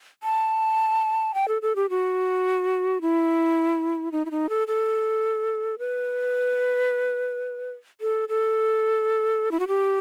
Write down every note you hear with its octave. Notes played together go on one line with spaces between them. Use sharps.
A5
G5
A4
A4
G4
F#4
E4
D#4
E4
D#4
A4
A4
B4
A4
A4
E4
F#4
G4